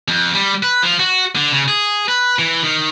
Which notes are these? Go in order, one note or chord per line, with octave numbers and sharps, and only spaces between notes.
F2
G3
B4
F3
F#4
D3
C#3
G#4
B4
E3
D#3